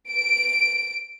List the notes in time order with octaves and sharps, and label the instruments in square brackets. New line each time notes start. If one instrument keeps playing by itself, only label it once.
[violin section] D7